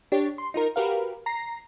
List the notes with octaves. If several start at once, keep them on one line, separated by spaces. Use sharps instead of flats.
D4 G4 C#5
C6
D#4 F4 A#4
F#4 G4 A#4 B4 F5
A#5 A#6 C7